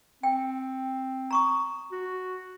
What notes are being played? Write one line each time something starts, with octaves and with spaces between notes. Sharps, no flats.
C4 G5
A#5 C#6 D#6
F#4